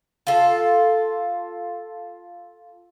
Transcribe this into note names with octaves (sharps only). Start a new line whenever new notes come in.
F4 A4